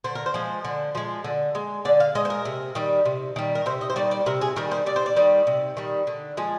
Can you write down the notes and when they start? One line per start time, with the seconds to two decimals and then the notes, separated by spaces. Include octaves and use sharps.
0.04 D3 C5
0.15 A#4
0.26 C5
0.34 F3 G#3
0.65 D3
0.95 F3 G#3
1.24 D3
1.55 G#3
1.85 D3 D5
2.00 F5
2.15 G#3 D#5
2.25 C5
2.30 A#4
2.45 C3
2.75 D#3 G3
3.06 C3
3.36 D#3 G3
3.55 A#4
3.66 C3 C5
3.81 D#5
3.90 C5
3.96 D#3 G3 D5
4.11 D5
4.26 C3 A#4
4.41 G#4
4.56 D#3 G3 A#4
4.71 C5
4.86 C3 D5
4.96 C5
5.06 D5
5.16 D#3 G3
5.47 C3
5.77 D#3 G3
6.07 D3
6.37 F3 G#3